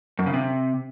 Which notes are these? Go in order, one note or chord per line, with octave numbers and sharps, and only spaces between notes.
F#2
C#3
C3